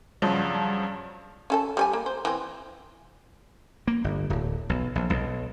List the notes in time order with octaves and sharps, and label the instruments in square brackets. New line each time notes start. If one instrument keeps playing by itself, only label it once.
[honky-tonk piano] G2 C#3 F3 F#3
[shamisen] C#4 A4 A5
G3 C#5 G#5
A#3
C5
E3 C4
[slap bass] A#3
G1
D1
B1
A#1
B1